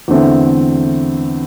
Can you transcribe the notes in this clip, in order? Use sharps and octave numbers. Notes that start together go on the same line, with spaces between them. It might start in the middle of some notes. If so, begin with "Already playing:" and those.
E2 D3 A3 C4